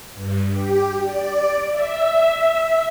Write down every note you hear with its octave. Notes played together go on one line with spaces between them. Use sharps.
G2
G4
D5
E5